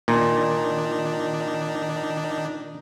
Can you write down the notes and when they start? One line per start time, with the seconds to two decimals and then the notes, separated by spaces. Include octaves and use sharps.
0.08 A#2 D#3 D4 D#4